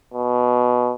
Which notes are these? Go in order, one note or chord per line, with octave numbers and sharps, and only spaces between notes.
B2